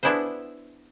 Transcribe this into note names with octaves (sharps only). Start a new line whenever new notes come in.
B3 D4 E4 G#4 B4 C5